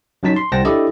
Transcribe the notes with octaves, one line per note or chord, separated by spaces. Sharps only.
F#2 F#3 D#4 A5 B6
C6
C2 C5 F#5 G5 A5 A#6
D4 E4 G4 A4 D5 D#5